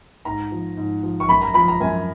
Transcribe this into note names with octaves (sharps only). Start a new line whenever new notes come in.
G#2 A#5
F3
G#2
F3
C#6
F#2 B5
A#5
F3 B5
A#5
F#2 G#5